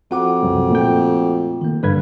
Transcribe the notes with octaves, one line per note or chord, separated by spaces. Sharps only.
F2 F#4 F#5 D6
C2 F#2
A#2 A3 G5
D#3 A#3
G2 D3 G3 B4 G#6